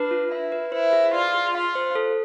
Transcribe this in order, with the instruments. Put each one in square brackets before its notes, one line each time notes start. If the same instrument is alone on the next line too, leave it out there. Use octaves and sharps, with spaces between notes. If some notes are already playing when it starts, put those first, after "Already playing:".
Already playing: [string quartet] D4 [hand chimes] B4
[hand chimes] F4
[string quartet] E4 [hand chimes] E5
[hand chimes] B4
[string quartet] E4 [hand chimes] C5
[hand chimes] G#4
[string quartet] F4 [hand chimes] D5
[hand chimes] G#4
[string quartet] F4 [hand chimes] F5
[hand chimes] C5
A4